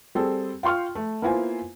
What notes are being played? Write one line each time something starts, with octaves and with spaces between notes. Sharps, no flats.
G3 C4 G#4 A4
F4 G5 C6 C#6 F6
A3
A#3 B3 E4 F4 C5 G#5